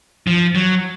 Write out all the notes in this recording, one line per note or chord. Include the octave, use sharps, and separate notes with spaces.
F3
F#3